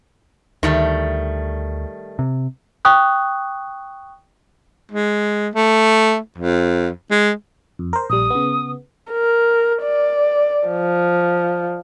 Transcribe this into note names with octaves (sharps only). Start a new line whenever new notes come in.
D2 D#3 G3 A3
C3
G5 C#6 D#6 F#6
G#3
A3
F2
G#3
F2
A#4 C5
A#1 G3 D#6
C#3 B3
A#4
D5
F3